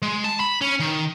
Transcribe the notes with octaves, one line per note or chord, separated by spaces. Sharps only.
G#3
A5
B5
C#4
D#3